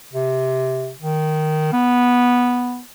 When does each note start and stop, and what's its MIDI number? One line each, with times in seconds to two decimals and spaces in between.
0.13 0.91 48
1.00 1.70 51
1.73 2.80 59